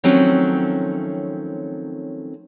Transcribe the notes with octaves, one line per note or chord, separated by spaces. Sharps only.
D#3 F3 F#3 A3 C4 C#4